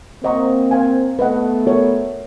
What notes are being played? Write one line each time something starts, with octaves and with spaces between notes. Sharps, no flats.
A#3 C4 C5 D#5 F#5 A#5 C#6
C5 F5 G#5
A3 B3 B4 D#5 F#5
F#4 A#4 C#5